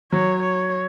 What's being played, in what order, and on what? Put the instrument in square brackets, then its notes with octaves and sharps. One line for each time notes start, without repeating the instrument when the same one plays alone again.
[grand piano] F#3 [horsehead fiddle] C#5
[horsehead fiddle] C#5